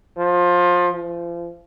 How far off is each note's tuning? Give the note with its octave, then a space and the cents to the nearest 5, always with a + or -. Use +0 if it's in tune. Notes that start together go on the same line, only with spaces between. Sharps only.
F3 +20
F3 -35